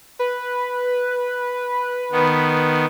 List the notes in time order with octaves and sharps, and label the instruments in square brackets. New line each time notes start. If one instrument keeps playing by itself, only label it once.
[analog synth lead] B4
[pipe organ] D#3 B3